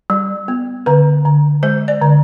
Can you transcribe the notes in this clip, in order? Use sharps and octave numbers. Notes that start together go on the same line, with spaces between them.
G3
B3
D3 B4
D3
G#3 C5
D5
D3